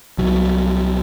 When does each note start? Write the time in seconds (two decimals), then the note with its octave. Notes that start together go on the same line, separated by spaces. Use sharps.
0.18 C2 F#3